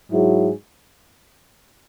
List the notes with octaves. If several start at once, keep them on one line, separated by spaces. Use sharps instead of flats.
G#2 F#3 E4 G#4